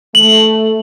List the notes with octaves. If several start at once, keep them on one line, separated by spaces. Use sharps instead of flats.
A3 F#7